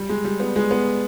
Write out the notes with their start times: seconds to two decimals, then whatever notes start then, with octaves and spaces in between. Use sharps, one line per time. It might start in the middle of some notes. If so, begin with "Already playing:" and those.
Already playing: G3
0.09 G#3
0.24 G3
0.40 B3
0.56 G#3
0.71 B3